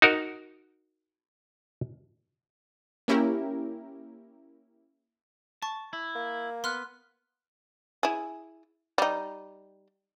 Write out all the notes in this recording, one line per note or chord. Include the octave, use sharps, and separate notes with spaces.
D#4 F#4 A#4
A#3 C#4 E4 G4 A#4
A5 C#6
E4
A#3
B3 C6 F6 F#6
E4 G#4
G3 D#4